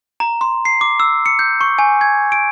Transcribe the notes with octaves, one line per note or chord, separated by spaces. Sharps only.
A#5
C6
C7
D6
E6
C#7
G6
C#6
G#5
G#6
D7